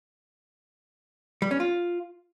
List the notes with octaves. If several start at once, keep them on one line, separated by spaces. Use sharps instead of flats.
G3
C#4
F4